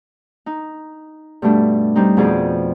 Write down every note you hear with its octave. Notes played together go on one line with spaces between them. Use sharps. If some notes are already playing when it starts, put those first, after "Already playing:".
D#4
G2 B2 A3 D4
G3 C4 D#4
F2 B2 F3 G#4 D5